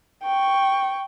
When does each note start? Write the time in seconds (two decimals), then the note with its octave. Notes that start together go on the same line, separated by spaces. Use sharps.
0.23 G5 C#6